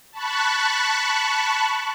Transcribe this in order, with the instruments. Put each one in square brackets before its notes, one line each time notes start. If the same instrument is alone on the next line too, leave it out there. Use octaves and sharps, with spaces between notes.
[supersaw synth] A5 B5 C#6 F#6